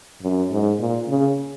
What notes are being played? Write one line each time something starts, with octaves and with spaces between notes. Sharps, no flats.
F#2
G#2
A#2
C#3